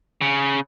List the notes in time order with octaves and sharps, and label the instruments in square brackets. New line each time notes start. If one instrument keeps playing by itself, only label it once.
[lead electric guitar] C#3